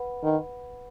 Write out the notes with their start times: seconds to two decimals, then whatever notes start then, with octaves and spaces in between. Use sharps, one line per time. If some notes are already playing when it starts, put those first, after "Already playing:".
Already playing: B4 F#5 B5
0.23 D#3